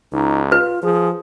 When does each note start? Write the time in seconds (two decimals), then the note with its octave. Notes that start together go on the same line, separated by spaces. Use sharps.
0.12 C#2 D#4
0.52 F4 B4
0.83 F3 G#4